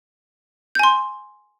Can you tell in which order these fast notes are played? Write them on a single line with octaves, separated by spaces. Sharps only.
G6 G#5 C6